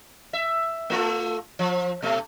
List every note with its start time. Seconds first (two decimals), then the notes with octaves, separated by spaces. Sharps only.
0.33 E5
0.90 A3 F4 A4
1.59 F3
2.02 B2 A3